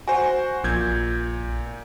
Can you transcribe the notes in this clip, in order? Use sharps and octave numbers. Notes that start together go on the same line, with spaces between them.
F#4 C5 G#5
A#1 A#2 G6 G#6